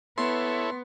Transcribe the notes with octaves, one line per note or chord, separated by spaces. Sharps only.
B3 E4 A4 C#5 C6